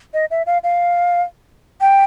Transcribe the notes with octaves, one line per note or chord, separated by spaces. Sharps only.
D#5
E5
F5
F5
G5